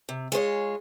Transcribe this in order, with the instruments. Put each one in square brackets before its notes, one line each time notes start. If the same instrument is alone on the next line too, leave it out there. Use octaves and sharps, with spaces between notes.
[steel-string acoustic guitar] C3
G#3 F4 C5 C#5